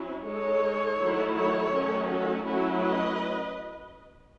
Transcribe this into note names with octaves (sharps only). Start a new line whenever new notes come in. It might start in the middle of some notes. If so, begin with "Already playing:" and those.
Already playing: F#3 C#4 E4
G#3 D#4 A4 C#5
D#3 F#3 A3 E4
A4 C#5
D#3 F#3 A3 C#4
F#4 A4
F#3 A3 C#4 E4 F#4
B4 D#5